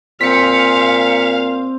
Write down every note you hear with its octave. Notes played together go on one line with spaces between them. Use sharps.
A#2 C4 F5 G5 G#5 B6 C#7